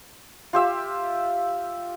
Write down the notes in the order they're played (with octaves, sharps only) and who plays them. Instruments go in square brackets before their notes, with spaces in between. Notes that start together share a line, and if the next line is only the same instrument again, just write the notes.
[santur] F4 G4 E5